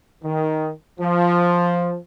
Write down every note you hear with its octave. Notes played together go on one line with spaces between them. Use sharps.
D#3
F3